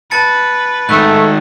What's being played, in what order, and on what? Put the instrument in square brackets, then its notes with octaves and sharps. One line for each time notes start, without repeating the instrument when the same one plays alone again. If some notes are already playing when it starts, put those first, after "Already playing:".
[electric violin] B4 [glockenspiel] A5 A6 C#7
[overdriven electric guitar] G#2 D#3 [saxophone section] A3 [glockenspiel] F#6